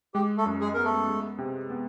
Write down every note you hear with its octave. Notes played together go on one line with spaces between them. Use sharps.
G#3 G4
A3 A4
F#2
G#3 G#4
B3 A#4
A3 A4
G#3
C3
B3